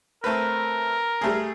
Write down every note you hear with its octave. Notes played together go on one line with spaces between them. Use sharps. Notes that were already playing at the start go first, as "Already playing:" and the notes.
A3 C4 A#4 B4
G3 A3 G#4